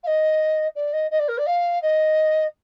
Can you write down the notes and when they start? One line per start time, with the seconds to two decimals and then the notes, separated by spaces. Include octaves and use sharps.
0.03 F5
0.07 D#5
0.75 D5
0.93 D#5
1.11 D#5
1.19 D5
1.28 A#4
1.38 D5
1.46 F5
1.82 D#5